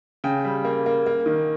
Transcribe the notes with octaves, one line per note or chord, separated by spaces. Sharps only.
C#3 G5
G3
A#3
A#3
A#3
D#3